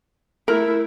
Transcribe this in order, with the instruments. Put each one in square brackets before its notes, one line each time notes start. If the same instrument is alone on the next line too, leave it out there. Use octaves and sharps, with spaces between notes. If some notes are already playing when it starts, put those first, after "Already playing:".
[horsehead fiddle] A3 E4 [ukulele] A#4